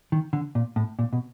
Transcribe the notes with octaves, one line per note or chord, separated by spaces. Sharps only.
D#3
D3
A#2
A2
A#2
B2